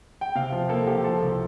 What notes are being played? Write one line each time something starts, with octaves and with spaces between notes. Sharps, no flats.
G5
C3 F5
F3
A#3 A4
F3 G4
F3 A4
C2